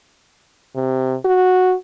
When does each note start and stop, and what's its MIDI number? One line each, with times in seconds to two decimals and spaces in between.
0.75 1.15 48
1.25 1.74 66